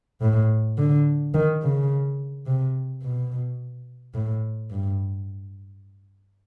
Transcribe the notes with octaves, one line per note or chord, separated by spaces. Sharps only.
A2
D3
D#3
C#3
C3
B2
A2
G2